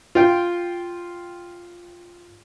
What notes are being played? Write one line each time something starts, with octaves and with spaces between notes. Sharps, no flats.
F4 G5